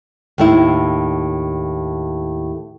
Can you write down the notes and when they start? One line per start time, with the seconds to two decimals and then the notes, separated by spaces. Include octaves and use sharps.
0.38 D#2 A2 E4